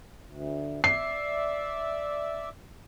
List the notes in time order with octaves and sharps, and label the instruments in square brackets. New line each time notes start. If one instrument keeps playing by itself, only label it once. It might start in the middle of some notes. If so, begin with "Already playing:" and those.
[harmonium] D2
[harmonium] D5 E5 [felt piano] C7